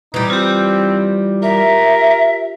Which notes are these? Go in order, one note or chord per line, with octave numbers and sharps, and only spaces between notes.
E3 G3 D#4
C4 F4 G4
A#4 E5